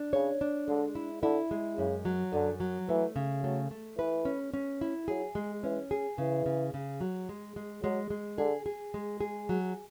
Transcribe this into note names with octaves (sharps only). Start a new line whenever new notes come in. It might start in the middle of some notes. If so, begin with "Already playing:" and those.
Already playing: D4
C#3 C#5
D4
D3 G#3
E4
D3 E4
G#3
F#2 C#3
F#3
F#2 D3
F#3
E3 A3
C#3
F#3 A3
A3
E3 B4
C#4
C#4
E4
F#3 G#4
G#3
E3 C#4
G#4
C#3 E3
C#3
C#3
F#3
G#3
G#3
F#3 G#3
G#3
D3 G#4
G#4
G#3
G#4
F#3